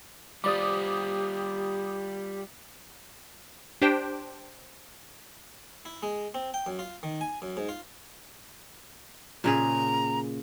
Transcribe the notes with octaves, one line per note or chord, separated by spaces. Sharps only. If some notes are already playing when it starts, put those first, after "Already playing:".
G3 F4 G4 C5 D5 B5 D6 D#6
D4 G4 C5 G5
E4
G#3
C4
G5
F#2
F4
D#3
G#5
F#2
G#2
F4
A#2 C#3 G#4 A#5